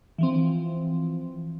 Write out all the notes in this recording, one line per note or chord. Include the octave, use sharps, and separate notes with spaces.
E3 F3 C4